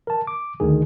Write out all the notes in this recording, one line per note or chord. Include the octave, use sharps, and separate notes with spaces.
A#4 A5
D6
D2 D3 D#3 G#4